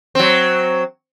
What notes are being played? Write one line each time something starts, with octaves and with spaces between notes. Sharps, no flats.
F#3 C4